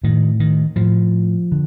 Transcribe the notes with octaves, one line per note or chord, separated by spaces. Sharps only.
A2 D#3
D#3
A2 F3
D3